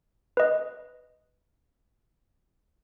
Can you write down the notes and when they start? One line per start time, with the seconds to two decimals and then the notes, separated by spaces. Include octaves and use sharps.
0.37 B4 D#5